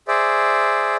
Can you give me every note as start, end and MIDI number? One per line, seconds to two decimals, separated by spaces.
0.08 0.96 68
0.08 0.96 72
0.08 0.96 74
0.08 0.96 76